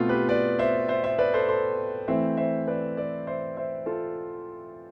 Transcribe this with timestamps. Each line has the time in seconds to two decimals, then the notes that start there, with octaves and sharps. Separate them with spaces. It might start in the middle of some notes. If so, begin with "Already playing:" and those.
Already playing: B2 A3 C4 F4 A4
0.09 G4 B4
0.29 B4 D5
0.59 C5 E5
0.88 C5 E5
1.04 C5 E5
1.18 B4 D5
1.34 A4 C5
1.48 A4 C5
2.08 E3 A3 C4 C5 E5
2.37 C5 E5
2.67 B4 D5
2.97 B4 D5
3.27 C5 E5
3.57 C5 E5
3.86 F4 A4